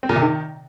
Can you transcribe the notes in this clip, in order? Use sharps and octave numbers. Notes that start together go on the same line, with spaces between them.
C4
A#2
C3
D#3